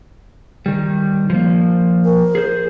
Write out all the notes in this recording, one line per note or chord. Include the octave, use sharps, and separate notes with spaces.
D#3 G3
F3 A#3
A#4
G#4 C5